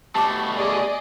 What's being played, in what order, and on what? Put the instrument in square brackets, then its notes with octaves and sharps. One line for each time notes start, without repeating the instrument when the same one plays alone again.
[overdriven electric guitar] B2 A3 [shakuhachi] G4 [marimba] A5 D6
[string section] G#4 D5 D#5